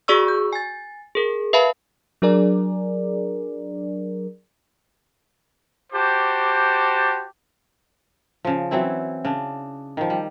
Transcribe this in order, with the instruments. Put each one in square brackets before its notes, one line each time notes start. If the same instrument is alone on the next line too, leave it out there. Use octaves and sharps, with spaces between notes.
[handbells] F#4 G#4 D5 C#6 E6
G6
G#5 A6
G#4 A#4
B4 E5 F5 A5 B5
[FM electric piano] F#3 D4 G#4 A#4 D5
[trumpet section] F#4 G4 C5 A5 D6
[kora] C#3 F3
E3 F#3 C4 E4
C#3 D4
D#3 F3
G3